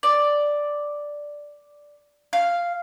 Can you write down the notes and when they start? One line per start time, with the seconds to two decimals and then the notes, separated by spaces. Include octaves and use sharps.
0.03 D5
2.33 F5